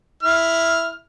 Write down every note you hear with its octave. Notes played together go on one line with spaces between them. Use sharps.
E4 F6